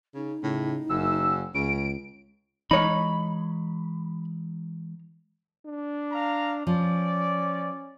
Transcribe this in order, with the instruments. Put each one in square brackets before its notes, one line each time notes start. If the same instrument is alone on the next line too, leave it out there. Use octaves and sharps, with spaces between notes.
[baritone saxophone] C#3 [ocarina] D#4
[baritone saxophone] A2 [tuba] C#3
[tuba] F#1 [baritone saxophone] F#2 [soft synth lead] E6
[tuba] C#2 [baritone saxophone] C#3 [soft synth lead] D7
[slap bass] E3 G#3 [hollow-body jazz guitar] D#4 C#5 [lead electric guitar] B5
[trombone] D4
[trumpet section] F5 A#5
[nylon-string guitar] F3 [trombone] C#4 [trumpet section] D5